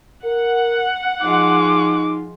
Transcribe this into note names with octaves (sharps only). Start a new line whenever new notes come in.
A#4 F#5
F3 G#3 D#4 F4 D6